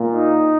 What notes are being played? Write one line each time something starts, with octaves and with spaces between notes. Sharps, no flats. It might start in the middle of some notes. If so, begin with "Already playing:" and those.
Already playing: A#2 A#3
D#4